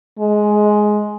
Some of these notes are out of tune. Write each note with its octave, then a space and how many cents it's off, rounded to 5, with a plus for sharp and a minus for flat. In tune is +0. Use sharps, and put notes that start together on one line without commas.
G#3 +10